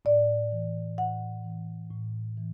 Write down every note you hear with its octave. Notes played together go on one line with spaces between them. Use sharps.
A2 D5
E3
A2 F#5
E3
A2
E3